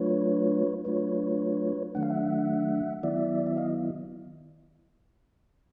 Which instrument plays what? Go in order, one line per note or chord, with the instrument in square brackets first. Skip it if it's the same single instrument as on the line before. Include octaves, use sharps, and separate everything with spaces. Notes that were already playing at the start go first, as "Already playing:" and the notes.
Already playing: [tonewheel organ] F#3 A3 D4 F4 B4 C#5
F#3 A3 D4 F4 B4 C#5
D#3 F#3 A3 D4 F#5
F5
E5 F#5
D#3 F#3 B3 E4 D5 E5
E5
D#5 F5